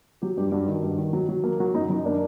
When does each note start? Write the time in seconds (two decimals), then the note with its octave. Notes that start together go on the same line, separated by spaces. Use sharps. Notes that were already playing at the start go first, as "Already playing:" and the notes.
0.22 F#3 G4
0.37 G2 G4
0.52 G2 F#4
0.68 D#3
0.83 G2
0.98 D#3
1.13 F#3
1.29 F#3
1.44 A#3
1.60 F#3 F#4
1.74 F#2 D#4
1.90 F#2 D#4
2.05 A#3 D4